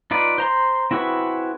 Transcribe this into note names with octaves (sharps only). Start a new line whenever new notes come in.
D#4 F4 B4 D5
C5 A#5 C6
C4 E4 F#4 G#4 B4